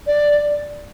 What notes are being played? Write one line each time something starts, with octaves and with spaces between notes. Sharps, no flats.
D5